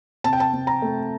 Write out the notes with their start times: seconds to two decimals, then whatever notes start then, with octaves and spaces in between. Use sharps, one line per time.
0.24 C3 A5
0.33 G5
0.40 A5
0.53 C3
0.67 A#5
0.82 A3